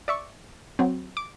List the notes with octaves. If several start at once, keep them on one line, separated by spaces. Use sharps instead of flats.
D5 E5 C#6
F#3 C4
D6